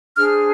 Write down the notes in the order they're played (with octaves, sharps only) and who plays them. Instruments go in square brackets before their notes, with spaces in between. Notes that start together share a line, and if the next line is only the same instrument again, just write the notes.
[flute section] D4 G#4 C5 F6